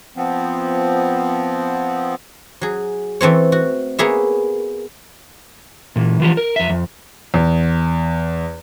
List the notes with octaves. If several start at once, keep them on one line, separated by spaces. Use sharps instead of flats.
F3 B3 C4
F#3 G#4
E3 A3 C4 C#5
F#4
A#3 B3 G#4 C#5 E5
A#2 E3
E3 F3 G4
A#4
F2 E5
F2
E2